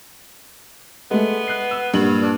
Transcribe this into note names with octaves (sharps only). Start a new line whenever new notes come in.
G#3 A3 B3
F#6 C7
E6
G2 A#2 F#7
D4